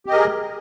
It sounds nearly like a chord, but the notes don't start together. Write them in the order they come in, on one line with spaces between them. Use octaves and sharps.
G4 D#5 A#4 G#4